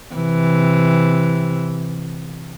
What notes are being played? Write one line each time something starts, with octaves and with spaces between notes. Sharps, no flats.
C3 E3